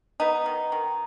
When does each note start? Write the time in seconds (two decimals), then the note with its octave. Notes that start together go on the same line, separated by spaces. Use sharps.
0.20 B3 D#4
0.46 D#3
0.72 D#3